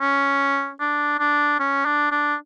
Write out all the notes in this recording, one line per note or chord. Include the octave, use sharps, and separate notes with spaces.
C#4
D4
D4
C#4
D4
D4